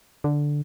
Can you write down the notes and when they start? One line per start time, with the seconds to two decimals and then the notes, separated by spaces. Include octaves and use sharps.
0.24 D3